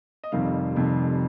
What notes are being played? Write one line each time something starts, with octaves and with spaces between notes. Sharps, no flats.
D#5
F1 F2 C3 D#3 G3 F5
F1 F2 C3 D#3 G3